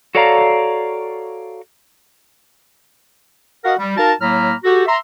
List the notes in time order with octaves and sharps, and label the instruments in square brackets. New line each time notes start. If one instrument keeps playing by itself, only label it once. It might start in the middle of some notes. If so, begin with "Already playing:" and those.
[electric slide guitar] F#4 A4 C#5 D5 F5 A#5
[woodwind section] F#4 A#4 D#5 F5 F#5
G3
D#4 F#4 A#4 F5 A5
A2 F#3 A#3 A#5 B5 F6
F#4 G4 A4
E5 A#5 C6